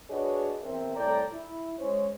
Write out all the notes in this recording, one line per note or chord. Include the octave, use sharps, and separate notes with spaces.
D4 F#4 G#4 B4 C#5 D#5
E2 C4 A#4 E5
C2 A2 A4 D5 G5 A#5
E4
G#3 C#4 C5 C#5